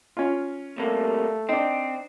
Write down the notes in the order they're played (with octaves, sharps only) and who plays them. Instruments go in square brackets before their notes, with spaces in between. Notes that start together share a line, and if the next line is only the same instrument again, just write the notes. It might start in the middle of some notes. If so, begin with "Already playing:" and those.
[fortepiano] C#4 F4
[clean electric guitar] C3 G3 A#3 [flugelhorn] A3
[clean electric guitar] C4 [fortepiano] D4 D#4